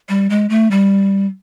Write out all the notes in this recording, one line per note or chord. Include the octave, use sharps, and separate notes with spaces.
G3
G#3
A3
G3